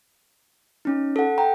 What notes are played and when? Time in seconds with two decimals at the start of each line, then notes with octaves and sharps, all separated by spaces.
0.85 C#4 D#4
1.16 A4 F#5
1.38 G5 A#5